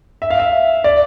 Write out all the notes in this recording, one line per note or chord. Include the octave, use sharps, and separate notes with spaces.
E5
F5
E5
D5